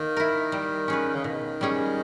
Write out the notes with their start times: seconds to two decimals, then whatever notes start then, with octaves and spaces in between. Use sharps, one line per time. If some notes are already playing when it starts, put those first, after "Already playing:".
Already playing: D#3 A#3
0.17 E4 A#4
0.52 G3
0.88 C#4 G#4 B4
1.14 C#3
1.24 B2 D#3
1.61 G3 C#4 G#4